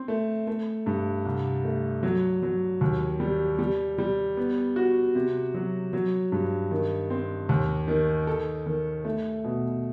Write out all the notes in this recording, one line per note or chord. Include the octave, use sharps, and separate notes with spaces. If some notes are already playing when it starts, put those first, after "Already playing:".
Already playing: C4
A3
A3
G2
C2
A3
F#3
F#3
D#2
G3
G3
G3
B3
F#4
C3
F#3
F#3
G2
D#3
C4
D#2
D#3
A4
D#3
A3
B2